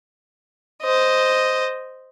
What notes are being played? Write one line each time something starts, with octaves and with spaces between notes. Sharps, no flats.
C5 D#5